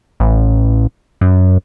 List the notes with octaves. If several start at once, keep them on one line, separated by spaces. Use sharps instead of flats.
A1
F#2